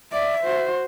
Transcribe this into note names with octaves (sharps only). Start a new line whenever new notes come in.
D5 E5
F#4 C5